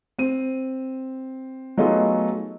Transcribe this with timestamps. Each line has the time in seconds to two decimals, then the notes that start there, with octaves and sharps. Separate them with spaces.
0.19 C4 D#7
1.77 F#3 A3 B3 D#4 F4 G#4